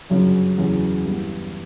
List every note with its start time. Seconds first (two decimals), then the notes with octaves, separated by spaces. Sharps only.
0.10 G1 F#2 C#3 F#3 C#4
0.58 E2 C#3 F#3
1.05 G2 E3 B3